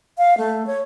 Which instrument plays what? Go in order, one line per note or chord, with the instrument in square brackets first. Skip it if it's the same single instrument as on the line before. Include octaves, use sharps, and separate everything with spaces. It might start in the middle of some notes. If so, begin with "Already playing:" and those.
[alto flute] F5
A3
C#5